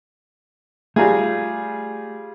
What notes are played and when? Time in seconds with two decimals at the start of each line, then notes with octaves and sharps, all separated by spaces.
0.96 G3 A3 F4 G#4 A#5